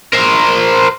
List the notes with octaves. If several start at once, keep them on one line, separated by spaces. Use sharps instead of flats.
A#4 C5